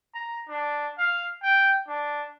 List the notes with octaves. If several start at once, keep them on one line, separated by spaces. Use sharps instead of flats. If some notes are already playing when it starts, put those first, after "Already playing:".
A#5
D4
F5
G5
D4